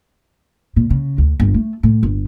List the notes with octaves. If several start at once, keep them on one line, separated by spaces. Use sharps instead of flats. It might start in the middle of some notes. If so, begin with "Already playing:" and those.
A#2
C#3
D2
G1
A3
A2
G1